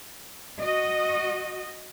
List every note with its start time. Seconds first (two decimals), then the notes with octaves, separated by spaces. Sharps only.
0.61 F#4 D#5